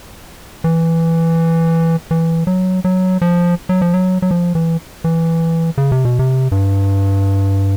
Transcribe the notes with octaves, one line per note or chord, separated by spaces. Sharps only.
E3
E3
F#3
F#3
F3
F#3
F3
F#3
F#3
F3
E3
E3
C#3
C3
B2
C3
G2